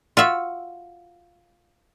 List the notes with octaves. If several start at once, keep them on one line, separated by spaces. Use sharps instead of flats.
F4 F#4 E5